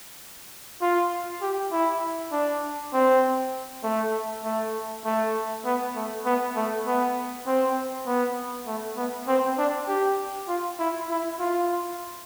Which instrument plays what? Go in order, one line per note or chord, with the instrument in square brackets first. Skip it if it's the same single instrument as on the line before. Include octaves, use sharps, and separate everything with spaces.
[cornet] F4
G4
E4
D4
C4
A3
A3
A3
B3
A3
B3
A3
B3
C4
B3
A3
B3
C4
D4
G4
F4
E4
E4
F4